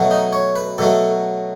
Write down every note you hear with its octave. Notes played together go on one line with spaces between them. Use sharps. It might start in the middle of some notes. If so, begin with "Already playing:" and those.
Already playing: B2 F#3 A3
D#4
C#5
B4
B2 F#3 A3 A4